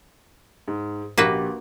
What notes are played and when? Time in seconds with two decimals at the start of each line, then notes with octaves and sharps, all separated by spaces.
0.68 G#2
1.18 A#1 A#3 F#4 G4 B4